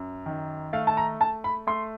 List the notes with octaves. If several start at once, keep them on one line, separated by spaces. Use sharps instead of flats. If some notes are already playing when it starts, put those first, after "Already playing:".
Already playing: F#2
D#3
A3 F5
A5
A#5
A3 A5
B5
A3 C6